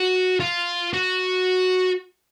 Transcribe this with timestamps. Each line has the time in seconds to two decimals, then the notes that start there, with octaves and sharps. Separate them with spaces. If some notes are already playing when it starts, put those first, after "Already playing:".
Already playing: F#4
0.40 F4
0.93 F#4